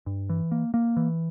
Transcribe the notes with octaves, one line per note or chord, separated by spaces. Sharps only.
G2
E3
A#3
A#3
E3